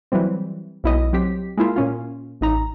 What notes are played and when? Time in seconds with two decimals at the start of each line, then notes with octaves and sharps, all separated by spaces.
0.12 E3 F#3 G3 C4
0.84 B1 E4 D#5
1.13 F#3 C4 G4 B6
1.58 G#3 A#3 E4 F4
1.76 A#2 C#4 F4
2.41 A1 D#4 A#5